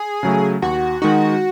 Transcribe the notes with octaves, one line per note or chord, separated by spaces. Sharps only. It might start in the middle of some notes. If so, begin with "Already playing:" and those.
Already playing: G#4
C#3 F#3 A3
D#2 F#4
D#3 G#3 D#4 F#4